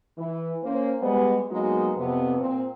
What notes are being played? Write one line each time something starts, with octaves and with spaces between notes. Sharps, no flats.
E3
A#3 C#4 C5
G3 G#3 B3
F#3 G#3 A#3 B3 D#4 F#4
F2 C3 B3
A#2 C4